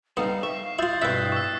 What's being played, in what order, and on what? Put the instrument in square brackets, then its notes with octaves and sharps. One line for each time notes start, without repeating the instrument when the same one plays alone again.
[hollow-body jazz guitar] G3 D#4 A4 [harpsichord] B3 [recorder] F5
[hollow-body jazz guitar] E5 [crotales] C#6
[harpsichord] E4 F4 [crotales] D#6 G6 A6
[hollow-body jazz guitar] G2 B2 E4 [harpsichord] B4 E5 [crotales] E6 F#6 B6
[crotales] C#6 E6